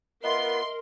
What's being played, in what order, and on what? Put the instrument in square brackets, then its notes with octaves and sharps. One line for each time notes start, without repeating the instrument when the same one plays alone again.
[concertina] B3 F4 B4 [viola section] A#4 [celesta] D#5 E5 [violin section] C6